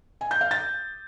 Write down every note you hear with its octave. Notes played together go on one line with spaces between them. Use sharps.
G#5
G6
F5
A6